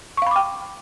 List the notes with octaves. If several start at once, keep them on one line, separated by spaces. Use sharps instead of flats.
F5 G5 B5 C#6 D6